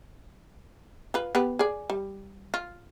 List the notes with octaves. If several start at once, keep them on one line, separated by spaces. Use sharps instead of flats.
F4 B4
B3 G4 B4
G#4 D5
G3
F4